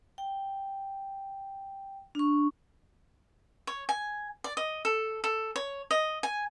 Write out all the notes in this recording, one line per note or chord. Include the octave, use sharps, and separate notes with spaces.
G5
D4 C#6
C#5
G#5
D5
D#5
A4
A4
C#5
D#5
G#5